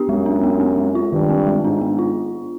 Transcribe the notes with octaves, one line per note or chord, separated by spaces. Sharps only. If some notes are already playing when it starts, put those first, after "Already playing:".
Already playing: B3 D4 G4
F#2 G#3
D4
B3
C4
G#3
F4
G2 D#3
C4
G#3
G#2 D4
B3
F4